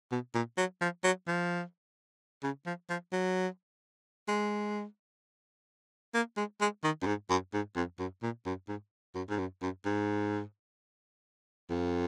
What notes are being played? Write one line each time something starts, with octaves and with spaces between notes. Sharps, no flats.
B2
A#2
F#3
F3
F#3
F3
C#3
F3
F3
F#3
G#3
A#3
G#3
G#3
D#3
F#2
G#2
F#2
G#2
F2
F#2
A#2
F#2
G#2
F#2
G#2
F#2
F#2
G#2
F2